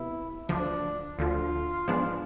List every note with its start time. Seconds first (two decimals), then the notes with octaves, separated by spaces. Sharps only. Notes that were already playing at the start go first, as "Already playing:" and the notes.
Already playing: C3 B3 E4
0.49 D2 D3 F3 D4
1.18 D2 D3 F3 F4
1.88 G#2 F3 G#3 B3 D4